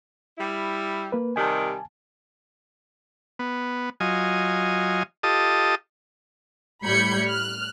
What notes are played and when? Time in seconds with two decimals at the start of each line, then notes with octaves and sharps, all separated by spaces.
0.37 G3 E4
1.12 A#3 B4
1.36 C3 D#3 G3 G#5 A5
3.39 B3
4.00 F#3 F4 D#5 G#5
5.23 F4 G4 A4 D#5 A5 D#6
6.84 A2 G3 B5 G6 G#6 C#7
7.28 F6 F#6